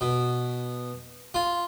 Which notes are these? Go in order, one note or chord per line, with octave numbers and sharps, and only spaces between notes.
B2
F4